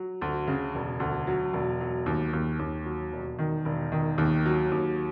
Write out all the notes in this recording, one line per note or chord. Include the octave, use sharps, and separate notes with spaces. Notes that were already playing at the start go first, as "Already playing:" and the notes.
Already playing: F#3
D2
C#3
E1
D2
F#3
E1
F#3
D#2
D#2
D#2
F#3
E1
D#3
E1
D#3
D#2
F#3
D#2